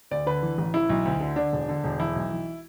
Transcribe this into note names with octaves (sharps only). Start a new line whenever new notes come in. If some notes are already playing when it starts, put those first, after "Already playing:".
D2 D5
D3 B4
E3
A1
E3 E4
B1
D2
D3
D3 D4
E1
D3
E1
E3 E4
B1
E3